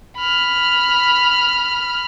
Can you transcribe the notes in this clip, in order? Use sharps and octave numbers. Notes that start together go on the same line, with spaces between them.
B5 F6